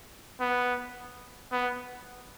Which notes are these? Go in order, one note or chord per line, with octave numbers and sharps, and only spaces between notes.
B3
B3